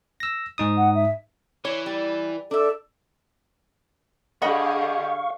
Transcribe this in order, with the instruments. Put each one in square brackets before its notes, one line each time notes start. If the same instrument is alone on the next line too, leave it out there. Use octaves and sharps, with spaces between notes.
[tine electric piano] E6 A#6
G#2 D#4 D#6
[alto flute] F#5
E5
[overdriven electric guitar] E3 [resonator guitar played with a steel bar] C#5
[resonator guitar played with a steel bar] G3
[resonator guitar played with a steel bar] D4 E5 [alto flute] A4
[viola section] D3 G4 G#4 [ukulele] D#5 F#5 B5 [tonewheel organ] F5 C#6